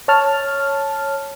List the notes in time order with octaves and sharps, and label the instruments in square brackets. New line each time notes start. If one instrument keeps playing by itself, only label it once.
[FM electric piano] C#5 A5 F6